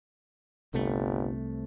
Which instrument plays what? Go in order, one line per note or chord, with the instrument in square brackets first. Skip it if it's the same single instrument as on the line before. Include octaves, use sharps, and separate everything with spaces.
[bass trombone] G1 [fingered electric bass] C2 C3 A3